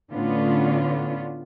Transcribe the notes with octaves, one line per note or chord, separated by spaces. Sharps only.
A2 D3 B3 C#4 D4 F4